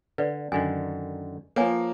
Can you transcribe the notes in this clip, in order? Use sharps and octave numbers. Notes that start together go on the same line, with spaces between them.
D3 B4 D5
F#2 D3 D#3 G#5
F3 A#3 B4 C#5 G#5